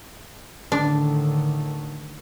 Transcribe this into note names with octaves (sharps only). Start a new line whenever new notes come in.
A2 D3 D#3 D4